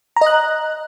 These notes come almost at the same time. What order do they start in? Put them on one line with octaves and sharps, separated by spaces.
A#5 D#5 F#6